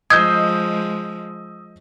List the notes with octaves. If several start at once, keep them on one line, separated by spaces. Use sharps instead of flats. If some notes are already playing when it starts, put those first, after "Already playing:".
F3 G#3 D#5 D#6 E6 G6 G#6